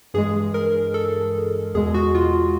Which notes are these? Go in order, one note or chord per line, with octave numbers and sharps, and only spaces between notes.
G2 E3 G#3 G#4
A#4
A4
E2 B2 G#3 G#4
F#4
F4